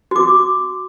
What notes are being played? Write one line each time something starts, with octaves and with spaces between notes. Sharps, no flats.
F#4 D6